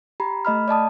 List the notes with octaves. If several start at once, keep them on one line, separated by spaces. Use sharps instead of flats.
G4 A#5 B5
A3 D#5 B5 F6
D5 D#5 A5 D#6